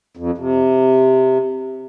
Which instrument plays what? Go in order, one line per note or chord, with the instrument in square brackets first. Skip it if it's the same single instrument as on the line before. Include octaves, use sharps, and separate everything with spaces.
[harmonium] F2
C3